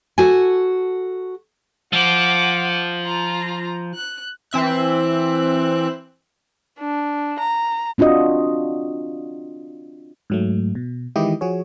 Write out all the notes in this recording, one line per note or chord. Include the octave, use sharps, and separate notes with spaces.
F#4 A4 G#5
F3 F#5 D6
F4 A#5
F#6
E3 C4 E5 F#6
D4
A#5
C4 D4 F4 F#4 D#5
G#2 F#3 A3
B2
D#3 E3 G#3 E4 G4 D#5
F3 F#4 G#4 C#5